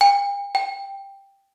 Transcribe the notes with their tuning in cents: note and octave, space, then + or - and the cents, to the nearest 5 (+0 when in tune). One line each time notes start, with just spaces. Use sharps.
G5 +45
G5 +5